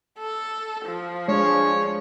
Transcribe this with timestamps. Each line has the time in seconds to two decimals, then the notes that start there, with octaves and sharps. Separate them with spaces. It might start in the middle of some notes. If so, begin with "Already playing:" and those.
0.19 A4
0.86 F3
1.28 G#3 D4 G#4 C#5